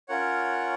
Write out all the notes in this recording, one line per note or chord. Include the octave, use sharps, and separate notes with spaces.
C#4 F4 A#4 C#5 F#5